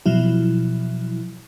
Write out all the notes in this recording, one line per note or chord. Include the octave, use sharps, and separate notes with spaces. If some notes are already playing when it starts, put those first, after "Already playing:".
B2 F3 F#3 E4